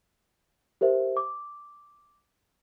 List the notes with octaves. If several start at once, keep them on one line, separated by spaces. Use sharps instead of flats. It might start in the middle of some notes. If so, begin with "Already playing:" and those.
G4 A#4 C5 E5
D6